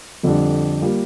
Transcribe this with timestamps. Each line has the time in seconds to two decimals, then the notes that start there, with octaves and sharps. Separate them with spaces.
0.23 F2 D3 G3 D4
0.82 G3 A#3 F4